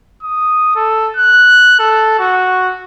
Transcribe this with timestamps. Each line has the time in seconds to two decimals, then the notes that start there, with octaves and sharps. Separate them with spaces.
0.23 D#6
0.76 A4
1.17 F#6
1.79 A4
2.19 F#4